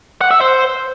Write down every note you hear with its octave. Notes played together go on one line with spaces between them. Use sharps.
F#5
E5
C5